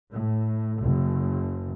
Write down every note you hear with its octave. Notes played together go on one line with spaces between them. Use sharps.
A2
F#1